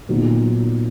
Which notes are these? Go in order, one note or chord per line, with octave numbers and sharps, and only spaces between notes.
A#2 F#3 B3 D#4 F#4